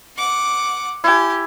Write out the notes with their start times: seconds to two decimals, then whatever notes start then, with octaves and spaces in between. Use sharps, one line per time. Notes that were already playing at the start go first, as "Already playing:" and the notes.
0.16 F#5 D6
1.04 E4 G4 G#5